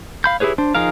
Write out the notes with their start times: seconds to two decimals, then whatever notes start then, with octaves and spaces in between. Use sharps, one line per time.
0.24 F5 B5 G6
0.40 E4 G4 G#4 B4 C#5
0.58 D4 C5
0.75 F3 D#4 G#4 A#4 F5